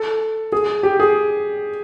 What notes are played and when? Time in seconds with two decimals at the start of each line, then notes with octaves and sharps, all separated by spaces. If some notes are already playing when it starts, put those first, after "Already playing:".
Already playing: A4
0.52 G#4
0.83 G4
1.00 G#4